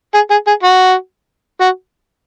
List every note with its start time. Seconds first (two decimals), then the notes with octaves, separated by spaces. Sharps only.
0.14 G#4
0.31 G#4
0.47 G#4
0.63 F#4
1.60 F#4